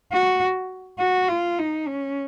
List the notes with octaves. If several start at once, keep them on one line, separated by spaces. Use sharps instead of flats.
F#4
F#4
F4
D#4
C#4